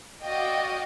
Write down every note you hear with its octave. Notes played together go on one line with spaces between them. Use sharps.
F#4 D5 D#5 F5 G5